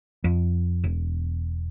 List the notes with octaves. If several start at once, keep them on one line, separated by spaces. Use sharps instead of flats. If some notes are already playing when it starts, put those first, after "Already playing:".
F2
E1